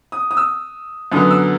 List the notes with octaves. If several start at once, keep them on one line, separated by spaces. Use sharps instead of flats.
D#6
D#6
E6
F#2 D3 F#3 B3 D#6
E6